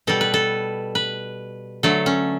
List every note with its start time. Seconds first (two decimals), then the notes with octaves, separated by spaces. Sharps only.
0.07 B2 G3 A4
0.21 B4
0.34 A4
0.95 B4
1.83 D3 F#3 A3 A4
2.06 C#4